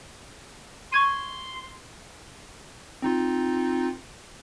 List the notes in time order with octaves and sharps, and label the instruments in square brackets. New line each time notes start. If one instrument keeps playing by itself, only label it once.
[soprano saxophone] C6 [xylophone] C#6 G#6 D#7
[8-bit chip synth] C4 D#4 F4